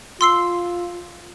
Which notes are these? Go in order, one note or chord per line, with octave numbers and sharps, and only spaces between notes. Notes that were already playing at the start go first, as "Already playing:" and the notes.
F4 C6 E6 C7